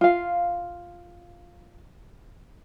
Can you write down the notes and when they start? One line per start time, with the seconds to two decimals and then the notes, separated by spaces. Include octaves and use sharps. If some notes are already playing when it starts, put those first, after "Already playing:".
0.01 F4 F5